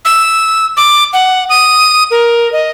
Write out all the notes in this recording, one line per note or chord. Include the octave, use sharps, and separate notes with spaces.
E6
D6
F#5
D#6
A#4
D#5